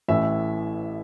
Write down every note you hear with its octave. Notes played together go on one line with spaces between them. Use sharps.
A1 A2 E3 E5